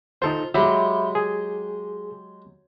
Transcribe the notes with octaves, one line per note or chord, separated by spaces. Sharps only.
D#4 F4 A4 C5
F#3 G#3 G4 E5 B5
G#4